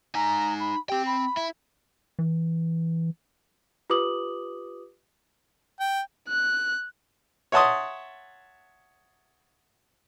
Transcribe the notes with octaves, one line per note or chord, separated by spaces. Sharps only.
D#4 G#5 A#5
B5
C4 G4 G5
B5
E4
E3
F4 G4 B4 D6 D#6 F#7
G5
F#6
C#5 E5 F#5 A5 C6 D#6